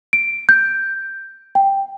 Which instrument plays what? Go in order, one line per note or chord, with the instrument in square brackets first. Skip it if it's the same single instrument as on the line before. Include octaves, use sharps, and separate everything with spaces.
[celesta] D7
G6
G5